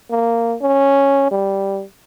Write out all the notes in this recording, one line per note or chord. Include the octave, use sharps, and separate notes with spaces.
A#3
C#4
G3